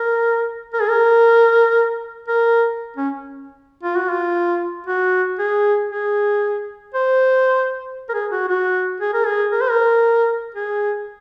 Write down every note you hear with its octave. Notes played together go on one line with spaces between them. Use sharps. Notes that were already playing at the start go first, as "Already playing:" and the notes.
Already playing: A#4
A#4
G#4
A#4
A#4
C#4
F4
F#4
F4
F#4
G#4
G#4
C5
A#4
G#4
F#4
F#4
G#4
A#4
G#4
A#4
C5
A#4
G#4